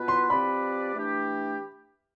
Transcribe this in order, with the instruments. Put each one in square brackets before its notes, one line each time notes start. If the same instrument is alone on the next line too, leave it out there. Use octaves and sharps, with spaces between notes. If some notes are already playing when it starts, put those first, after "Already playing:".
Already playing: [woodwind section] B2 B3 F4 B4
[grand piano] C6
[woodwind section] F3 C4 G4 B4 D5 [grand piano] B5
[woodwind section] E3 A3 D4 G4